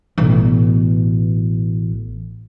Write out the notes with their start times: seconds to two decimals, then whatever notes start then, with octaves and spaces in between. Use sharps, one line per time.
0.18 A1 B2